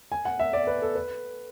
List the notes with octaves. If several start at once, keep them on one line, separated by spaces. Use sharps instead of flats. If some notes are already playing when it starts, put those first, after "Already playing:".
G#5
F#5
E5
D5
B4
A4
B4